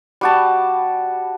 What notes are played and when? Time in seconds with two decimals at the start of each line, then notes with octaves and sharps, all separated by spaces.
0.21 G3 F#4 A5